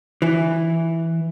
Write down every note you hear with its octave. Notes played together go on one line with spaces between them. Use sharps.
E3